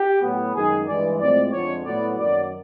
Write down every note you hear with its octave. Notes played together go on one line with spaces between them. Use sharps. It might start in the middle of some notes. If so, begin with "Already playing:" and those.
Already playing: G4
A2 F#3 B3
F#2 D#3 G#3 G#4
G2 E3 G#3 D5
A2 F3 G#3 C4 D5
F2 D3 F3 G#3 C#5
A2 F#3 B3 D5
F#2 D#3 F#3 A#3 D5